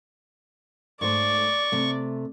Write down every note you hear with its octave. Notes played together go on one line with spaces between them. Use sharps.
G#2 A3 C5 D5 C#6
C3 A3